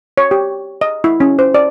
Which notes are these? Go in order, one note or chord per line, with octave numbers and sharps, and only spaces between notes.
C#5
G4
D#5
E4
C#4
C5
D5